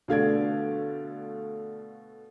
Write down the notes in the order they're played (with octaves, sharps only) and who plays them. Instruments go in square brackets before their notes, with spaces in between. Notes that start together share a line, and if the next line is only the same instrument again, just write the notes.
[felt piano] B2 A3 D5 [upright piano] D3 F5 G#6